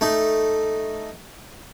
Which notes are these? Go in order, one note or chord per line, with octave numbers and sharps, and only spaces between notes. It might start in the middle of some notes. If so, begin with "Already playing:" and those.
A3 D#4